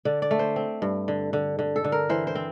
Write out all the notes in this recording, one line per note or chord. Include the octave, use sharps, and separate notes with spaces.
D3 D5
D5
A3
C5
C4
G2
D3
D3
D3
A4
D3
A#4
E3 C5
C5
C4